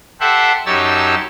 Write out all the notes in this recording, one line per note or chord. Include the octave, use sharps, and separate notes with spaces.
G4 A4 C5 E5 F#5
F#2 D#4 G4 C#5 A5 E6